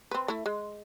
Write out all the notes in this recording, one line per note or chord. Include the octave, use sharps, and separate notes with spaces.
C4 B4
A3 E4
G#3